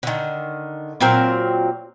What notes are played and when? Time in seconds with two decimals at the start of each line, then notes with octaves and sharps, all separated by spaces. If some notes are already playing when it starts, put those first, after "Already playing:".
0.03 D3 D#3
1.01 A#2 F#3 C4 A#4